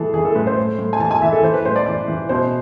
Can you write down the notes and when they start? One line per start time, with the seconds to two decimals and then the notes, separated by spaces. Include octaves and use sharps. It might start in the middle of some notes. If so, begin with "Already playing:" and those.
Already playing: A2 E3 G#4 A4
0.14 E3 G#4
0.25 A4
0.35 A2 B4
0.47 C5
0.57 A2
0.79 A2
0.93 G#5
1.00 E3 A5
1.11 G#5
1.22 E3 E5
1.33 A4
1.43 E3 C5
1.54 B4
1.65 A2 C5
1.76 D5
1.86 E3 D5
2.08 E3
2.29 B2 C5